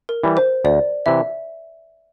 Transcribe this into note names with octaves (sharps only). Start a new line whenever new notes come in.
A#4
E3 G3
C5
D2 D5
C3 E3 E5